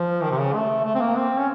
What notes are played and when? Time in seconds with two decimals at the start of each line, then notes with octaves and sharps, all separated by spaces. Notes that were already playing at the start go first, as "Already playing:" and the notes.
Already playing: F3
0.23 D#3
0.31 C3
0.39 C#3
0.54 A3
0.85 A3
0.95 C4
1.01 A#3
1.16 C4
1.38 C#4